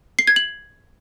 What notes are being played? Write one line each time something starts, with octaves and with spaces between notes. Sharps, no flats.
C7
G#6
F#7